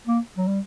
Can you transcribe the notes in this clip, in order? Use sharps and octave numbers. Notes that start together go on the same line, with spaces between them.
A#3
F#3
G3